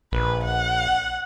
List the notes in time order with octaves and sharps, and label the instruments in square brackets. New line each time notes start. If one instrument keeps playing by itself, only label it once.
[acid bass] A#1 [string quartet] B4
[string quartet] F#5